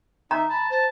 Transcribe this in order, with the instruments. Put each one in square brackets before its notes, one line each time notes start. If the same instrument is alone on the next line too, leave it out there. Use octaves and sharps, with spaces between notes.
[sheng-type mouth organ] D#4 E5 [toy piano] A#5
[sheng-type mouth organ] A5 [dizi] B5
[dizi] C5 [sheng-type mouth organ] A5